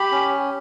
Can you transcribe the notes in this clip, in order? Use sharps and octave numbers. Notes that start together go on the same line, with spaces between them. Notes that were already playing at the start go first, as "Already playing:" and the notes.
Already playing: G4 B5
C#4